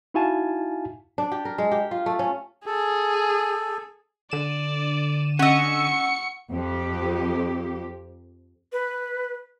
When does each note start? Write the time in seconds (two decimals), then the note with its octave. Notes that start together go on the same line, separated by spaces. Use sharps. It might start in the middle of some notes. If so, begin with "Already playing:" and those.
0.14 D#4 E4 F#4 F5 G#5 A5
1.18 D4
1.32 G4
1.45 A#4
1.58 G#3
1.71 G4
1.91 F4
2.06 A3
2.19 C#4
2.66 G#4 A4
4.31 D3 D5 D#7 E7
5.39 C#4 D#5 F#5 C#6 E6 C#7
6.51 F2 G4
8.72 B4